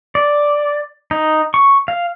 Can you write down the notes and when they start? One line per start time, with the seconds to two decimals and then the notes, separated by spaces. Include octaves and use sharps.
0.15 D5
1.11 D#4
1.54 C#6
1.88 F5